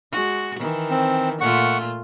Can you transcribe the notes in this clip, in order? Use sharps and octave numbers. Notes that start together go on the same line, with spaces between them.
G#3 F#4
D#3 E3
C4
A#2 A3 F4 F#5 C#6